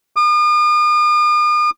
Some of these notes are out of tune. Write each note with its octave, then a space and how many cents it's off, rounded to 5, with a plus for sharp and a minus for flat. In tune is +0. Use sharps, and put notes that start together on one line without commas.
D#6 -45